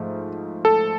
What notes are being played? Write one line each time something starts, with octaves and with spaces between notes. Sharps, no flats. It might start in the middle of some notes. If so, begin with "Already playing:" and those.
Already playing: G#2 F3 A3
A4